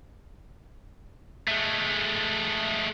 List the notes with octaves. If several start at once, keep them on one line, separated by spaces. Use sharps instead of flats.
G#3 A3